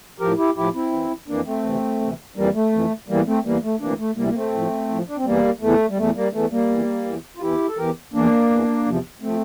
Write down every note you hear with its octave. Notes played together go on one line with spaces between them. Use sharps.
A2 F3 G4 A#4
E4 G4
A2 F3 E4 G4
C4 E4
F2 E3
F2 E3 A#3 D4
A3 C4
D2 C3 E3
D2 C3 E3
F2 E3 G3 A#3
A3
F2 E3
E2 E3 G3 A#3
A3 C4
E2 E3 G3 A#3
A3
D2 C3 E3 A#3 D4
A3
D2 C3 E3 G3 A#3
A#3
A3 C4
A2 F3
A2 F3
D4
C4
E2 E3 G3 A#3
E2 E3 A3
G3
E2 E3 A3
G3 A#3
E2 E3 A3
G3 A#3
E2 E3
E2 E3
F4
E2 E3 E4 G4
A4
E2 E3 G4 A#4
E2 E3 A#3 D4
E2 E3
E2 C3 F3
C3 F3 A3 C4